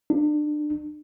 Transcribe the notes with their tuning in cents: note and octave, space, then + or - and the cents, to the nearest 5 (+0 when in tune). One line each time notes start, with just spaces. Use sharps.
D4 +30